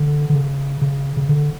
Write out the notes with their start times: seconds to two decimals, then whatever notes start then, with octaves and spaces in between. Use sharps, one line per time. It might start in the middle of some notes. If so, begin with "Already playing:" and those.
Already playing: D3
0.30 D3
0.35 C#3
0.82 C#3
1.17 C#3
1.29 D3